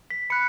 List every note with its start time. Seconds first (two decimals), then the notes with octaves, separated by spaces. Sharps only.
0.10 B6
0.30 B5 F#6 C#7